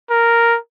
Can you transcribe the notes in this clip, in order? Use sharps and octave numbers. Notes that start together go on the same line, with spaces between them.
A#4